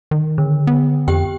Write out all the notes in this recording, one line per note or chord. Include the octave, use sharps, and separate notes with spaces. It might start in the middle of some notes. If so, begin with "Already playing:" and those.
D#3
D3
B3
F2 G4 G5